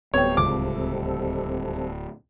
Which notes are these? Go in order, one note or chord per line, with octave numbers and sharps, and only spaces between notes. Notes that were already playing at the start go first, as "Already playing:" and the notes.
D1 G3 B3 C4 A4 C#5 G5
C#2 D6